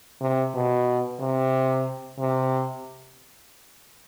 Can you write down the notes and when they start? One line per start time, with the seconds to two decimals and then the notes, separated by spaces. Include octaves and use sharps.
0.21 C3
0.55 B2
1.20 C3
2.20 C3